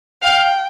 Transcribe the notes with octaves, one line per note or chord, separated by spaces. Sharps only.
F5 G5